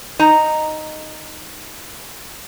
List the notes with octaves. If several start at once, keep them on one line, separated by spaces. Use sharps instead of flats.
D#4 D#5 A#5